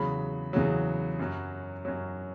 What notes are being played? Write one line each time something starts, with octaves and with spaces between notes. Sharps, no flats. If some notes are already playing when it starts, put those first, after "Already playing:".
Already playing: E2 C#3 F#3 B5
E2 C#3 F#3
F#2 F#3
F#2 F#3